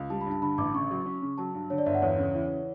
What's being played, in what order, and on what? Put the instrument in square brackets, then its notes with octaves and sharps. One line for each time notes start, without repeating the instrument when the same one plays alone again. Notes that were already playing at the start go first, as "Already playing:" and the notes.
Already playing: [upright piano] C#2
[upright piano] G3 [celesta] A5
[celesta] B5
[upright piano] G2
[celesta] A5
[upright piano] D3 [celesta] B5
[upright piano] A1 [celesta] D6
[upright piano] C#3 [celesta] C#6
[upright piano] F#3
C#4
C#3
[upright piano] F#3 [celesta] A5
[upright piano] G2
[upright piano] D3 [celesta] C#5
[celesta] D5
[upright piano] G1 [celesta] E5
[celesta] F#5
[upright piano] E2 [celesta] C#5
[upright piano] C#3
E3